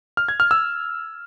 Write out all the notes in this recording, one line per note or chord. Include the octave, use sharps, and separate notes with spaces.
F6
G#6
F6
E6